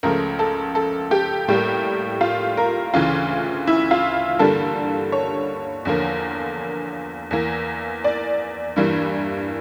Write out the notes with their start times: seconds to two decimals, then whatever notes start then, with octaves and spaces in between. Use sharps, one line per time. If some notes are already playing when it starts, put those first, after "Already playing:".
0.03 C#2 C#3 F3 A3 A#4
0.39 A4
0.75 A4
1.11 G4
1.48 A2 G3 A#3 G4
2.21 F4
2.57 A#4
2.94 D2 C#3 E3 F4
3.67 E4
3.91 F4
4.39 G2 D3 G3 A#3 A4
5.12 C#5
5.85 E2 D3 F3 A#3
7.31 E2 E3 A#3
8.04 D5
8.76 G2 E3 G3 A#3